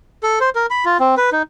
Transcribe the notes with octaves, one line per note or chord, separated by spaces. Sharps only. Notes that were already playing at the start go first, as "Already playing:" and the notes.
A4
C5
A#4
B5
F4
C4
B4
D#4